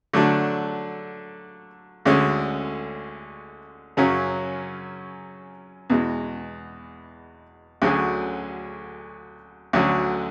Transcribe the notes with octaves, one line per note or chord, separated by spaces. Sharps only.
D3 F#3 A3 D4
D2 D3 G#3 C#4
F#2 C#3 F#3 C#4
E2 B2 G#3
D2 D3 F#3 C#4 G#4
D2 D3 F#3 C#4